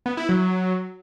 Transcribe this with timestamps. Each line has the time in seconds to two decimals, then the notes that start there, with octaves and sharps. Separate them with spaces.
0.06 B3
0.17 E4
0.29 F#3